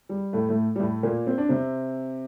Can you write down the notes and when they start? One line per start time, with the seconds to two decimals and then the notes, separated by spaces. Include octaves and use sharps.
0.09 G3
0.33 A2 A3
0.49 A2 A3
0.76 G3
0.80 A2 A3
1.03 A#2 A#3
1.27 C4
1.38 D4
1.49 C3 C4